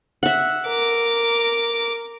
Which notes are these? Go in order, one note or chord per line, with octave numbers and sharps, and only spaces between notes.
E5 F#5
A#4 D6